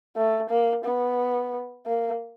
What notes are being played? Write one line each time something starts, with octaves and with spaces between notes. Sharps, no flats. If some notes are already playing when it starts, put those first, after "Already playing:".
A3
A#3
B3
A#3